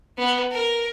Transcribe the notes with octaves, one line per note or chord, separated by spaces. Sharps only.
B3
A#4